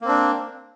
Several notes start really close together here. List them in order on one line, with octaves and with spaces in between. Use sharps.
A#3 C4 D4